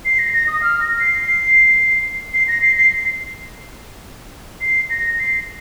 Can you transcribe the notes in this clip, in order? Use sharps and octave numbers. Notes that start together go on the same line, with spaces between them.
C7
A#6
A#6
D#6
F6
A#6
C7
C7
A#6
C7
C7
C7
A#6
C7